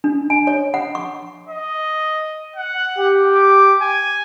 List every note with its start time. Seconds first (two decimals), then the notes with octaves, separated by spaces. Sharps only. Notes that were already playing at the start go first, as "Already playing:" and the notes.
0.04 D4
0.30 G#5
0.47 C#5
0.74 F#5
0.95 C#6
1.49 D#5
2.56 F#5
2.98 G4
3.35 D6
3.81 G#5